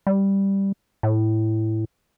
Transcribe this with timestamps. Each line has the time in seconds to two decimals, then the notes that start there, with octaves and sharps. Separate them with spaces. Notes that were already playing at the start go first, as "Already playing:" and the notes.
0.07 G3
1.03 A2